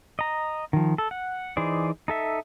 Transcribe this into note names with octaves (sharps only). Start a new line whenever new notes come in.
D#5 A#5
D#3 F3
A4
F#5
E3 D#4 G#4 C5 D5
D#4 A4 E5